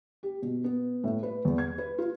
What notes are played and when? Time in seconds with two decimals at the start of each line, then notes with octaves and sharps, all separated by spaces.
0.23 G4
0.42 B2
0.64 B3
1.04 A2
1.23 B4
1.45 E2
1.58 G#6
1.78 B4
1.98 F4